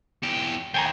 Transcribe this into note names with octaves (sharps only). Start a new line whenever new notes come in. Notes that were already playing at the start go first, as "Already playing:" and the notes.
E2 G4
D#2 G5 G#5 A#5